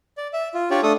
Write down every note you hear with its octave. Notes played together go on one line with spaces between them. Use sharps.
D5
E5
F4
D4 F4 G4 C#5 D5
A3 D4 A4 D#6